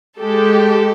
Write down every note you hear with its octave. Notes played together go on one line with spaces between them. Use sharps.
G#3 G4 A4